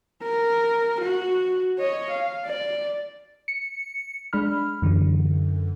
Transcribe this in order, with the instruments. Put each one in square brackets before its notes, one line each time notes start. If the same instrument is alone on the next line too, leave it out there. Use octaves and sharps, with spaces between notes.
[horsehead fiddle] A#4
F#4
C#5 D#5
F5
D5
[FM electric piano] C#7
G#3 D4 B5 F6
F#2 D3 E3